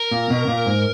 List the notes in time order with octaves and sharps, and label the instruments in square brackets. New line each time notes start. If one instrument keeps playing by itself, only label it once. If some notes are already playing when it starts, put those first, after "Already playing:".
Already playing: [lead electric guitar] A#4
[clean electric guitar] A#2
B2
A#2
G#2